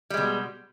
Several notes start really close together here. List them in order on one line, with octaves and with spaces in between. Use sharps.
G3 G#3 B2